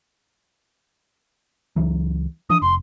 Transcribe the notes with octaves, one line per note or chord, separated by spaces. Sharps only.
C#2 E3 F#3
E3 F3 D4 D#6
F1 C6